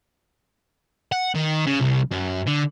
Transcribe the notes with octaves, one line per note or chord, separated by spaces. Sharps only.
F#5
D#3
C#3
C2
F#2
D3